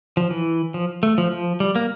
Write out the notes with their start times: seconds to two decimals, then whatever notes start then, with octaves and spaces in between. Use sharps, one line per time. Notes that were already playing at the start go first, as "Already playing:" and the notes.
0.17 F3
0.31 E3
0.74 F3
1.03 A3
1.18 F3
1.32 F3
1.60 G3
1.76 A#3